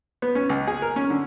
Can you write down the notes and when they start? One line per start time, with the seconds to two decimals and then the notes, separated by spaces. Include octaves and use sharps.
0.22 B3
0.35 C#4
0.49 C#2
0.67 G#4
0.82 A#4
0.96 C#4
1.10 D3